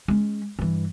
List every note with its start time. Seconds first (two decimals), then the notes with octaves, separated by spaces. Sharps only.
0.08 G#3 C#4
0.59 G2 E3